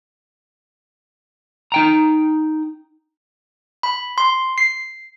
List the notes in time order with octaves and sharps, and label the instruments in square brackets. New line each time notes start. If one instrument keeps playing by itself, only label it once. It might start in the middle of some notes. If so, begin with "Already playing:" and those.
[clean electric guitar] D#4 G5 A#5
[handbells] B5
C6
C7